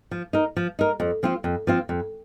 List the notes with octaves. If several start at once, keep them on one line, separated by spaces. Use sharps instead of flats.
F3
D#4 A#4
F3
D#4 A#4
F2
F3 C4 F4
F2
F3 C4 F4
F2